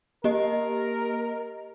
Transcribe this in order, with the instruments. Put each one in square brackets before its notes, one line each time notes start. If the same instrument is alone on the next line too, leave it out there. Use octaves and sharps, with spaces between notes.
[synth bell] A#3 G4 D#5 [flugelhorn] A#4